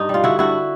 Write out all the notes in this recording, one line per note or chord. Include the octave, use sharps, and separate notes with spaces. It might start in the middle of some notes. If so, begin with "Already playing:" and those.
Already playing: G2 D#4
G3 F4
D3 E4 F#4
G2 E4 F#4